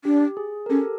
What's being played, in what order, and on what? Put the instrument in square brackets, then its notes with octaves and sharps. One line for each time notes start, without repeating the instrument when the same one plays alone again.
[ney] D4 [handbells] G4
[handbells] G#4
A#4
[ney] C#4 [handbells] G4 A4